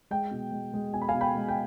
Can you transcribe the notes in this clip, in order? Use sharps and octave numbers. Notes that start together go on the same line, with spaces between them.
G#3 G5
B2
G#3
G#3
B2 G#5
B5
F5 G#5
B2
G5 B5
G#3
G5